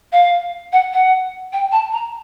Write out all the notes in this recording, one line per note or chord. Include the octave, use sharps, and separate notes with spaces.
F5
F#5
F#5
G5
A5
A#5